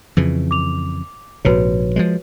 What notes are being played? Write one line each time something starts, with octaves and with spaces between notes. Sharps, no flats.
F2 C#3 E3
D6 F7
A#1 G#2 C3 F#4 B4 C#5
F3 F#3 G#3